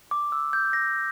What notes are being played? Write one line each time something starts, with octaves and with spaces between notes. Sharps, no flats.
D6
E6
G6
A#6